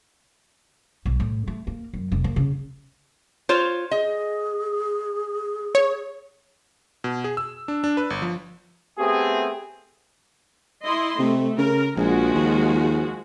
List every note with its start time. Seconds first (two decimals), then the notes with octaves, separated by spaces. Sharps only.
1.05 B1
1.20 A2
1.48 A3
1.67 A#3
1.93 F#2
2.12 F1
2.24 A#3
2.36 C#3
3.49 F4 C5 C#5
3.91 G#4 D#5
5.75 C#5
7.04 B2
7.24 G#4
7.37 E6
7.68 D4
7.84 D4
7.97 B4
8.10 G1
8.22 F3
8.99 A3 B3 C4 G4 G#4
10.83 E4 D#5 C6
11.19 C3 A3
11.58 C#3 A#4
11.97 A#1 F3 G#3 F#4
12.34 D#2